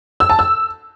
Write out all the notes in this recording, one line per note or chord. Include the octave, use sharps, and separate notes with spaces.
E6
A5
E6